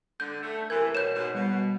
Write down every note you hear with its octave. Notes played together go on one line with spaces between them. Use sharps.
D3 G6
A3
C3 E3 A#4 G#6
B2 C#5 G6 E7
G#2 B2
B2 G3